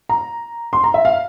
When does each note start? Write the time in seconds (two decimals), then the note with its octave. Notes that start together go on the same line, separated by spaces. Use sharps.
0.09 A#5
0.73 C6
0.84 A#5
0.94 E5
1.05 F5